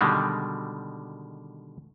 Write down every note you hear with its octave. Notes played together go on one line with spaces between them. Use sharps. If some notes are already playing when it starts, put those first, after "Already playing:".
B2 D3 D#3 G3 G#3